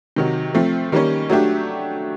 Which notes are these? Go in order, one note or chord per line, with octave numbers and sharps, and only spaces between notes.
C3 D#3 F#3
F3 A3 C4
D#3 G3 A#3 C#4
F#3 A3 D4 G4